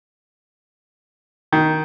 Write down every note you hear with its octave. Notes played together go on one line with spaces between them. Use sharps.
D#3